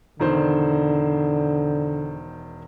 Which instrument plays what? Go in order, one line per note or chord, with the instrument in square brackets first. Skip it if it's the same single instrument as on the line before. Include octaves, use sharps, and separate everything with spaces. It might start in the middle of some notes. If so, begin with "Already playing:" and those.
[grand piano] E1 D#3 C5 [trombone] D3